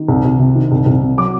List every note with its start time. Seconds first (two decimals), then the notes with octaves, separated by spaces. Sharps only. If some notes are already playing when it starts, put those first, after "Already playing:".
Already playing: D#3
0.08 C2
0.25 C2
0.39 C3
0.56 D#3
0.72 C2
0.86 C2
1.02 C3
1.18 F#3 D6